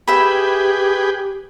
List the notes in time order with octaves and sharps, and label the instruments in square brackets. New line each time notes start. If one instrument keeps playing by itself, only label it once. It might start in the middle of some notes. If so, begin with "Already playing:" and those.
[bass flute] G4 [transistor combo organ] G#4 B4 G5 [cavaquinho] E5 B5